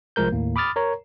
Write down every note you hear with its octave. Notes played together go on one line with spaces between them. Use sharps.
C2 F3 G#3 A#4 G6
D#2 A2 A#3
B5 D6 D#6 F6 A6
A#4 C#5 A#5